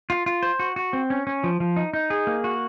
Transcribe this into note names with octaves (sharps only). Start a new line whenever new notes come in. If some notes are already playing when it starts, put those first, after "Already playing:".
F4
F4
C5
F#4
F#4
C4
C#4
C#4
F3
F3
D#4
D#4
G#4
A#3
F#4